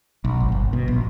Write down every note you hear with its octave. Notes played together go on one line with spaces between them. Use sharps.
B1
G#1
G1
B2
A#1